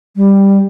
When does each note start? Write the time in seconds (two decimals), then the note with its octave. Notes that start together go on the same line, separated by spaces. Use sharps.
0.16 G3